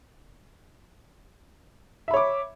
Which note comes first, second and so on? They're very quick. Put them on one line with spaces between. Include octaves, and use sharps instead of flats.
E5 B5 C#5 D6